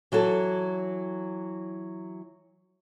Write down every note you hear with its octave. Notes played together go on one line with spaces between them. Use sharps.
E3 F#3 F#4 A4